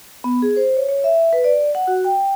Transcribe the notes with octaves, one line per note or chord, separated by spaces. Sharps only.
B3
G#4
C5
C#5
C#5
E5
B4
D5
F#5
F#4
G5